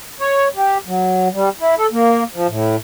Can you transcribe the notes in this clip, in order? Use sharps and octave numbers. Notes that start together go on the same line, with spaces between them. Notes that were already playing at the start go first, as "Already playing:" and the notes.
C#5
G4
F#3
G3
E4
A4
A#3
F3
A2